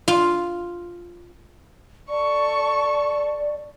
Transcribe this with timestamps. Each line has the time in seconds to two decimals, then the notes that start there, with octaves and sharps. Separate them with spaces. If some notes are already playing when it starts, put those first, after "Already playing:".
0.08 F4
2.09 A4 D5 C#6